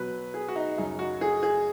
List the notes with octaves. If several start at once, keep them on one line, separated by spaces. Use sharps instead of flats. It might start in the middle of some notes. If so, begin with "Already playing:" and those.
Already playing: B2 F#3 B4
G#4
F#4
D#4
F#2 C#3 F#3 D#4
F#4
G#4
G#4